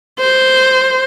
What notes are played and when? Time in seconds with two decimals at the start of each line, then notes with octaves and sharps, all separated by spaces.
0.20 C5